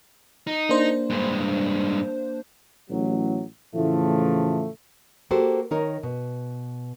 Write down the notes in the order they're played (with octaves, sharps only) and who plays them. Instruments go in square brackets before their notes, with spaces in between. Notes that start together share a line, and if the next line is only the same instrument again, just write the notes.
[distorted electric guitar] D#4
[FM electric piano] A#3 D4 C5
[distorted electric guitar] G2 G#3
[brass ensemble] A1 F#3
A2 C#3 E3 F3 A3
[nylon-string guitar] A#3 F#4 G4 A4 C5
D#3 D#4 A#4 C#5
B2